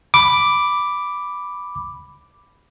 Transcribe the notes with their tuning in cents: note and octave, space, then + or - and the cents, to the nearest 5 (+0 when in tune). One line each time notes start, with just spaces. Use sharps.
B5 +0 D6 +0